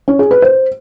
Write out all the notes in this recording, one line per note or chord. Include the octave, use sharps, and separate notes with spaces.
C#4
G#4
B4
C5